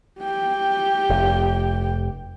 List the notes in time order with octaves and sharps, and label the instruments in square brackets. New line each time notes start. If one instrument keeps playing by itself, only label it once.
[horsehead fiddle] G4 G5
[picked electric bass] F1